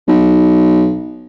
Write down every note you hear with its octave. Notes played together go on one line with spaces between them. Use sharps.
B1